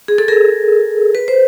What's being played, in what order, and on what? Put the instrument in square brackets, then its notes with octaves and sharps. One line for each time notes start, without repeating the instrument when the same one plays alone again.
[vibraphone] G#4
A4
G#4 A#4
B4
C5